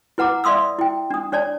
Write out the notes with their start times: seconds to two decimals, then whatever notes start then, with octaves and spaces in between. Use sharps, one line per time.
0.18 E4 B4 F#5 A#5 D6
0.44 D5 E5 F5 C6 D#6 E6
0.79 E4 G5
1.11 D4 D#6
1.32 D4 C#5 D5 A5